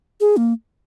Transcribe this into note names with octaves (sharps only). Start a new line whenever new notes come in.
G#4
A#3